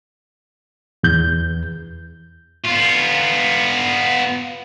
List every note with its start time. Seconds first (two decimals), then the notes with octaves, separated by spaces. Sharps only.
1.04 E2 G6
2.64 B3 F4